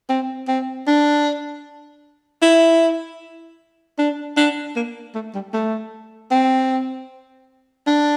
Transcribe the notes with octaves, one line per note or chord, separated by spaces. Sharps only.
C4
C4
D4
E4
D4
D4
A#3
A3
G3
A3
C4
D4